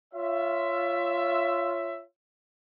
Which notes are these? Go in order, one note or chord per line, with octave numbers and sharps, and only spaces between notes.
F4 C#5 E5